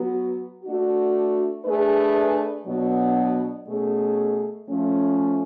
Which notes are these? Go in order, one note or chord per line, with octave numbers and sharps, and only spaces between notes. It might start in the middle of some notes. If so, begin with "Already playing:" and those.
Already playing: F#3 B3 F#4
A3 D4 F#4
A3 D4 G#4 B4
B2 F#3 B3 D4 F#4
B2 A3 C#4 G#4
F3 A3 C#4